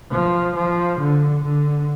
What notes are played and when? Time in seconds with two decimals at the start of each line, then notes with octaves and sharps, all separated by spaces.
0.11 F3
0.56 F3
1.00 D3
1.44 D3